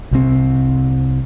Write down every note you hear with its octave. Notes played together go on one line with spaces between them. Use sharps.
C2 C3 D#3 C4